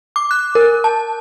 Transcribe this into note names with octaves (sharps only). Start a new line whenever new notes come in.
D6
F#6
A#4
A5